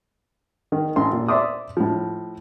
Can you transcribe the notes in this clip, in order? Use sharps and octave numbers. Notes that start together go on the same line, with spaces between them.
D#3
A1 C6
A#2
D5 E5 C6 D6 D#6
A2 F3